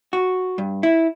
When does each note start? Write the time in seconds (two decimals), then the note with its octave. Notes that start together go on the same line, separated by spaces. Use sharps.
0.13 F#4
0.58 G2
0.83 E4